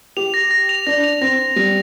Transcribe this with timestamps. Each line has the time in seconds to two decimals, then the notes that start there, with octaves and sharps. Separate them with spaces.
0.17 G4 F7
0.34 A#6
0.51 A#6
0.69 F7
0.87 D4 A#6
1.04 F7
1.21 C4 A#6
1.39 A#6
1.56 G3 A#6